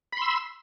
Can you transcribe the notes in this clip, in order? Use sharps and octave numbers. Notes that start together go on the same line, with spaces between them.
B5 C6 E6